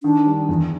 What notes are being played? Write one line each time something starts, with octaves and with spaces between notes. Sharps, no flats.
D#3 D4
G3
E2